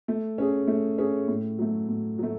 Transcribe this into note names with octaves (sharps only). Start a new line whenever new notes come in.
A3
C#4 G#4
A3
C#4 G#4
A2
F#3 A3
A2
F#3 A3